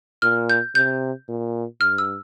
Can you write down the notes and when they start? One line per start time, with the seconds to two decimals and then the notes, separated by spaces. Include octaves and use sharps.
0.22 A#2 F6
0.50 G6
0.75 C3 G6
1.29 A#2
1.81 G2 F6
1.98 E6